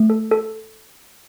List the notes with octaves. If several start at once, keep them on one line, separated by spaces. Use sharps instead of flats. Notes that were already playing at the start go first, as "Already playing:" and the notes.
Already playing: A3
A4
A4